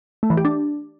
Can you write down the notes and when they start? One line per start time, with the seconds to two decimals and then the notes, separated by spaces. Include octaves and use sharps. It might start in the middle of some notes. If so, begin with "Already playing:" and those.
0.23 A3
0.30 E3
0.37 G4
0.45 D4